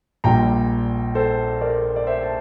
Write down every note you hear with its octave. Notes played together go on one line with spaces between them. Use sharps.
A#1 A#2 G3 G5 A#5
A4 C5
A#4 D5
D5
C5 E5
A5